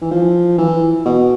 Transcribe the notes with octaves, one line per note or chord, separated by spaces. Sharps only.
E3
F3
E3
B2